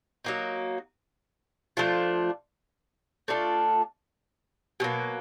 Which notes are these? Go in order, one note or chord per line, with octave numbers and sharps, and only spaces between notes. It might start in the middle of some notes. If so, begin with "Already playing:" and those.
F#3 A#3 D#4
F3 A3 D4 F4
A3 D4 F4 A4
B2 F#3 A#3